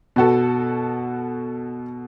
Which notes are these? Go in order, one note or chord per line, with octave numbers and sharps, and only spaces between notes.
B2 B3 F#4 A4